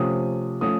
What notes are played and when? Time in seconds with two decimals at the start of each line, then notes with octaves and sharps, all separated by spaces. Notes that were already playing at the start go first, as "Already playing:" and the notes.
Already playing: C3 F3 A3 C#4 D#6
0.61 F3 A3 C#4 D#6